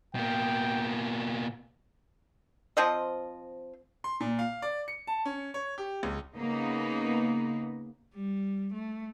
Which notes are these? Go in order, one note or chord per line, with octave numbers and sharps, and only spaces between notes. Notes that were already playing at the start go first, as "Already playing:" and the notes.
B2 A#3 G5
F3 C4 D#5
C6
A#2
F5
D5
C#7
A5
C#4
C#5
G4
C#2
C#3 A#3 B3 D#4
G3
A3